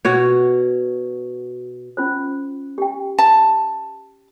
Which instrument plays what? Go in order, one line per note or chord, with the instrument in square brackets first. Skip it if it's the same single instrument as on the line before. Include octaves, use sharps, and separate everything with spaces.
[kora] B2 F#4 C#5
[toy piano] C#4 F4 C5
G4 G5
[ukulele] A5